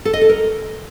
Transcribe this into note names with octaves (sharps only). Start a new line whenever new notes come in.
A4
D#5
A4
A#4